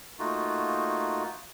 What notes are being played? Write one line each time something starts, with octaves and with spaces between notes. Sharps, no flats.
A3 A#3 D#4 F4 F#4